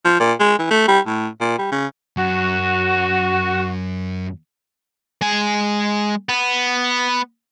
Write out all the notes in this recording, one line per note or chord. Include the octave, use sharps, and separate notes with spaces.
F3
A#2
G#3
E3
A3
G3
A2
A#2
G3
C#3
F#2 F#3 F#4
G#3 G#5
B3